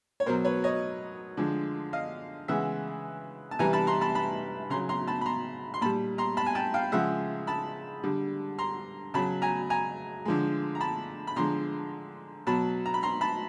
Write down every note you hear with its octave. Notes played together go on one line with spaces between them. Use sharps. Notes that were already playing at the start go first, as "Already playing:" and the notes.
C#5
B2 F#3 A#4 C5
B4 C#5
C#5 D#5
D3 F3 G#3
D#5 F5
C#3 E3 G#3 E5 F#5
A5
C3 E3 G3 G#5 A#5
A5 B5
A#5 C6
A5 B5
A5 B5
C#3 F#3 A#5 C6
A#5 C6
A5 B5
B5
A#5 C6
C6
A#2 G3 A5 B5
A#5 C6
A5 B5
G#5
G5 A5
F5 G5
C#3 F3 G#3 E5 F#5
A5 B5
D3 G3
A#5 C6
C#3 F#3 A5 B5
G#5 A#5
G#5 A#5
D3 F3 G#3
A#5
A5 B5
B5
D3 F3 G#3 A#5 C6
B2 F#3 A5 B5
A#5
B5
A#5 C6
A5 B5